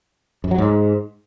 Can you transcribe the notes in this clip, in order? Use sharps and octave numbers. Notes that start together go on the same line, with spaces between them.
F#2
F#3
G#2